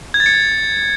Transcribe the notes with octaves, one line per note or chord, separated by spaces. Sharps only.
G#6
A6
C#7